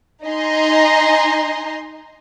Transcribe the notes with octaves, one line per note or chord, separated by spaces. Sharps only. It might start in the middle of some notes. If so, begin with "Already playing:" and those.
D#4 D#5 G#5 A#5 C6